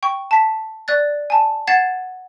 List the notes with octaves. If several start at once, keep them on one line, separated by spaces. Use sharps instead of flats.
G5 C#6
A5 B6
D5 F#6 A6
G#5 A5
F#5 G#6 A6 C7 E7